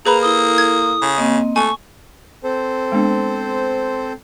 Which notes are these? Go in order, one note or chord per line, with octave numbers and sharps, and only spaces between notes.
A#3 G#4 B4 A#5 B5
E4 A4 D#6
G#6
C#3
A#3 C4 D#5
A3 G#5 C#6
C4 A4 C5
G#3 B3 D4